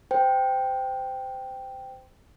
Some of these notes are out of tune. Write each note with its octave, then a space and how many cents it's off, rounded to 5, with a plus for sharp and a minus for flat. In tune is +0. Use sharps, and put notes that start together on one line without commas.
C5 -25 G5 +0